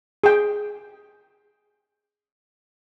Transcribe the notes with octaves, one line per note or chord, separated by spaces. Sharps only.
G#4 G5